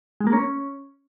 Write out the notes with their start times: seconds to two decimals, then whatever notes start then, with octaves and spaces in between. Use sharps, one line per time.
0.20 G#3
0.27 A#3
0.33 C#4